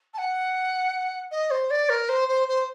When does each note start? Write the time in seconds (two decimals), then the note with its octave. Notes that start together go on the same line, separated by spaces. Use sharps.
0.13 A5
0.18 F#5
1.31 D#5
1.50 C5
1.70 D5
1.89 A#4
2.08 C5
2.28 C5
2.48 C5